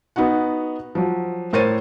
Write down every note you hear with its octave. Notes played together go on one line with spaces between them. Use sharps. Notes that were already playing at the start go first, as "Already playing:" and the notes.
B3 D#4 F#4 F#5
F3 F#3
A2 A#4 C5 C#5 A6 D#7